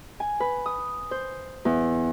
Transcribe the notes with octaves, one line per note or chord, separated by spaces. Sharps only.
G#5
B4
D#6
C5
E2